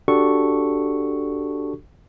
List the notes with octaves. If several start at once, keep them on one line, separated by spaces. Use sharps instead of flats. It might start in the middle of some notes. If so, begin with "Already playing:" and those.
D4 F#4 G4 A4 C#6